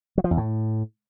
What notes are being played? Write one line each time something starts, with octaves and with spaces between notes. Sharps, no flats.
F#3
F3
E2
A2